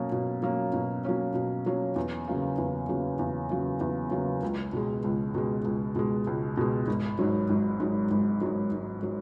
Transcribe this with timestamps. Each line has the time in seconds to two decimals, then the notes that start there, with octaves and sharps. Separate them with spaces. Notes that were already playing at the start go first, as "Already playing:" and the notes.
Already playing: B2 F#3 A#3 C#4
0.12 B2
0.43 F#3 A#3 C#4
0.74 B2
1.04 F#3 A#3 C#4
1.34 B2
1.66 F#3 A#3 C#4
1.96 E2
2.28 C#3 F#3 A#3
2.58 E2
2.88 C#3 F#3 A#3
3.19 E2
3.50 C#3 F#3 A#3
3.81 E2
4.11 C#3 F#3 A#3
4.43 C#2
4.73 B2 G#3
5.04 C#2
5.34 B2 G#3
5.65 C#2
5.96 B2 G#3
6.27 C#2
6.57 B2 G#3
6.87 G#1
7.19 G#2 F#3
7.50 G#1
7.80 G#2 F#3
8.11 G#1
8.41 G#2 F#3
8.72 G#1
9.03 F#3